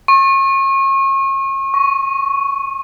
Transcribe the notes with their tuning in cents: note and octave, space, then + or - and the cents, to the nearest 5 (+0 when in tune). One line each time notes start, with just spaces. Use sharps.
C#6 -35
C#6 +5